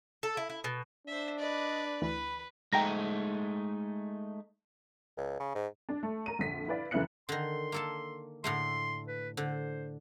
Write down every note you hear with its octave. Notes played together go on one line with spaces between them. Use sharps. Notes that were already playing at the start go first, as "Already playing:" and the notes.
A4
E4
E4
B2
D4 C5 E5
B4 D5 D#5
D2 E3 B4 B5
G#3 A3 D#4 G5 A#5 A#6
C#2
C#3
G#2
D4
A3
A#4 A#5 D#7
A#1 F2 D3 B6
E4 B4 D5 F5
F1 C#3 E3 E5 F#6 C#7
D3 D#3 C6
A#3 A4 A5
A2 D3 A3 C6
B4
D3 C5